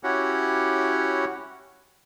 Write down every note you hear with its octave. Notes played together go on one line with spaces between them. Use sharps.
C#4 E4 F#4 G4 C#5 F#5